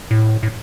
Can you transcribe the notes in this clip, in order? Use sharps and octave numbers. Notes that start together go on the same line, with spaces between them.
A2
A2